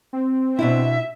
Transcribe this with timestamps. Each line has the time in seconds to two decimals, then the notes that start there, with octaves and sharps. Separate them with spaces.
0.13 C4
0.59 B2 D4 E4 E5